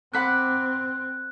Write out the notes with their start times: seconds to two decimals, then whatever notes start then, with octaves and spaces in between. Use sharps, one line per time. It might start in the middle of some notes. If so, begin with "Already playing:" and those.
0.14 C4 F#5 B5 D6 F#6